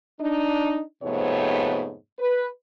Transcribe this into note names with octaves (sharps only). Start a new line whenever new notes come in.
D4 D#4
F2 G#2 C3 A3 B3 C#5
B4